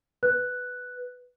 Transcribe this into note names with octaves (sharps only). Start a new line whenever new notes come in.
B4 F#6